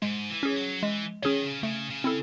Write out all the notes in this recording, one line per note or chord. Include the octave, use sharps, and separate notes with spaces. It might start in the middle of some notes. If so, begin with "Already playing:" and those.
G#2 G#3
E3
C#4 G#4 C#5
F#3
E3 G#3
D#3 C#4 G#4 C#5
C#3
C#3 A3
C#3
C4 E4 A4